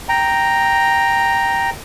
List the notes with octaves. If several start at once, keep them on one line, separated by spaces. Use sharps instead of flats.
G5 A#5